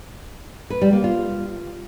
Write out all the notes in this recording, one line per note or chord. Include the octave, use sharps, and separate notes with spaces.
B4
G3
A#3
F4